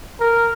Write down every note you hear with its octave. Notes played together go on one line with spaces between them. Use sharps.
A#4